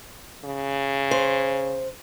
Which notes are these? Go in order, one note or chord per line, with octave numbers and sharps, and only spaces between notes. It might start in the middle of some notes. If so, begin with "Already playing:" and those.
C#3
C5